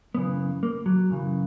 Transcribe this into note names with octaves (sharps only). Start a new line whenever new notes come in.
F#2 C#3 E3 B3
A#3
F#3
F#2 C#3 E3